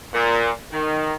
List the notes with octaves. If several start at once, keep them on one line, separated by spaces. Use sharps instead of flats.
A#2
D#3